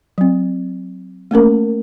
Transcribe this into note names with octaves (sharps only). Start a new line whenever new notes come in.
F#3 C4
A3 A#3 C#4 A#4